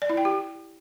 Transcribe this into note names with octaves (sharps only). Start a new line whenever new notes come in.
D5
E4
G5
G4